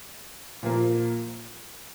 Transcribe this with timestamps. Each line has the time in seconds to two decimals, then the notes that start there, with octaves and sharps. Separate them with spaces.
0.63 A#2 F3 A#3